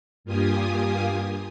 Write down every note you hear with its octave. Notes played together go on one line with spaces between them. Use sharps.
G2 A#3 F4 G4 G#5 D#6